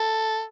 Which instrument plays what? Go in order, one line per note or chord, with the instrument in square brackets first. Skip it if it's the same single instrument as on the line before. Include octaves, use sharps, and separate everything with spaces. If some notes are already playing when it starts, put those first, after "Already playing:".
Already playing: [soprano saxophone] A4